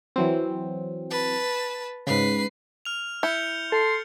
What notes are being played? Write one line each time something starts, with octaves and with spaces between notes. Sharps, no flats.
E3 F#3 C4
B4 A5
G#2 C#3 B4 C7
F6 F7
E4 G6 C#7 G7
A4 C6